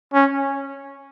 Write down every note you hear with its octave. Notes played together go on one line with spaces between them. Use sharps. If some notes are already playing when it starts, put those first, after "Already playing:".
C#4